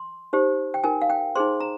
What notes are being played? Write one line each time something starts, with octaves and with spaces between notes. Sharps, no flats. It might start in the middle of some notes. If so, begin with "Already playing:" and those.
Already playing: C6
D#4 G4 C5
G5
D#4 A#4 G#5
F5
G5
D#4 G#4 C5 C6
A#5